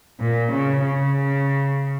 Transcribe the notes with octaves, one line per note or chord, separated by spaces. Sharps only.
A#2
C#3
C#3